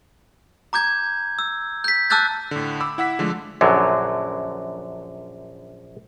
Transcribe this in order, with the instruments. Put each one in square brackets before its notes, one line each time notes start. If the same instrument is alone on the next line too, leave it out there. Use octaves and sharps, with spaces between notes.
[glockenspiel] A#5 D6 G6 G#6
E6
G6 B6
A5 D6 E6 F#6 G6 A6
[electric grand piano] A2 D3
B5 D6 E6
E4 F#5 E6 B6
D3 F3 G#3 A3
[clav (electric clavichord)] A#1 F#2 D3 F#3